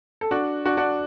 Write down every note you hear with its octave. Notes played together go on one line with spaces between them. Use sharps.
A4
D4 F#4
D4 F#4
D4 F#4